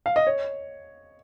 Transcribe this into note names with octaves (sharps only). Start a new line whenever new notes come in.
F5
D#5
C#5